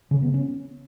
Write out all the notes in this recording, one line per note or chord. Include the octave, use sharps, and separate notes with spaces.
C#3
B3
C#4